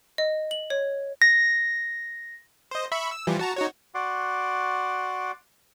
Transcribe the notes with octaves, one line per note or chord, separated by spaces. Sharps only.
D#5
F#7
C#5
A#6
C5 D#5
E5 B5 C#6
E6
E3 F3 G3
F#4 A5 A#5
D#4 F#4 C#5
F#4 D5 F#5 C6 D6